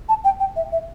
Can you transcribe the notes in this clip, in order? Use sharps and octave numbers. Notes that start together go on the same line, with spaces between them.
A5
G5
G5
E5
E5